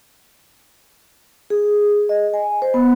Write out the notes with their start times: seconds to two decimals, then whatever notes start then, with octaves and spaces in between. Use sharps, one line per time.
1.50 G#4
2.09 D#5
2.34 G#5
2.62 C5
2.74 B3